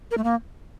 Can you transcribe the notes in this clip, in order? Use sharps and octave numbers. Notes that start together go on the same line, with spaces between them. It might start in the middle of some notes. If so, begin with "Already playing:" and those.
A#4
A3
A#3